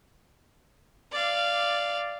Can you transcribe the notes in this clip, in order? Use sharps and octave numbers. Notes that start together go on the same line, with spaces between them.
D5 F5